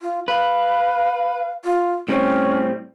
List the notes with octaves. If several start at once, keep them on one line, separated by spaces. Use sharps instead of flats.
F4
B4 F5
F4
A2 G3 C4 C#4